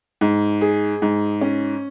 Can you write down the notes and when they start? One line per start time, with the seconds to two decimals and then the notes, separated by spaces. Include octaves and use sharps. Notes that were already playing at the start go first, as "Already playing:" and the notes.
0.21 G#2
0.61 G#4
1.02 G#2
1.41 C#4